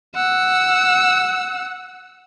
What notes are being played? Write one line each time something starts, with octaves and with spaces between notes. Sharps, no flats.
F#5 E6